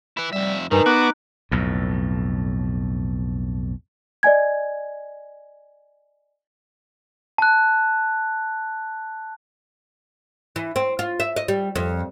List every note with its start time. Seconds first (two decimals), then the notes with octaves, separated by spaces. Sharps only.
0.17 E4 B4
0.33 F2 G3 E5
0.71 G2 D#3 D#4 A#4 B4 G#5
0.86 B3 F#4 D6 F#6
1.51 B1 F2 A2
4.23 D5 D#5 G#5 G#6
7.38 A5 F#6
10.56 E3
10.76 C4
10.99 F4
11.20 E5
11.36 D#5
11.48 G3
11.76 F2